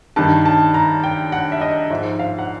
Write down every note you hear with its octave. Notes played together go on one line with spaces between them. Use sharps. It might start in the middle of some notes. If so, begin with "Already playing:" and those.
G2 D#3 A5
A5
A#5
G5
F#5
E5
D#5
G#2 F3 E5
F5
F#5